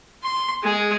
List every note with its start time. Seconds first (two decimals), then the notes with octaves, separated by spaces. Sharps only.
0.23 C6
0.63 G#3 G#4